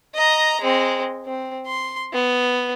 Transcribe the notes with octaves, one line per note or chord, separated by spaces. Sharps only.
D#5 A#5
G#3 C4
C4
C6
B3